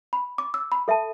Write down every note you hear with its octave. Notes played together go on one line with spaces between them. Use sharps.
B5
D6
E6
B5
A4 E5 A5